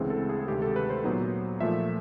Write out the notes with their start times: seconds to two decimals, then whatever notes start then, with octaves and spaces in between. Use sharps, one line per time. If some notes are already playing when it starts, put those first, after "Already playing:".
Already playing: D2 C#3 E3 G#3 C4
0.10 A4
0.29 G#4
0.48 D2 C3 D#3 G#3 G4
0.62 A4
0.76 B4
0.90 C5
1.04 A#2 F#3 B3 D#4
1.60 A#2 F3 A3 E5